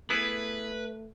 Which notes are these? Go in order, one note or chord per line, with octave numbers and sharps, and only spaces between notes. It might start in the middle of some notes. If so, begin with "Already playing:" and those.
A3 B3 E4 G#4 B4